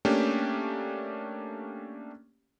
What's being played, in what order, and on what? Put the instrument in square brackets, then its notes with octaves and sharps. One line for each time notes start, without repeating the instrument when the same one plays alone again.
[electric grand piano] A3 A#3 C#4 D4 G4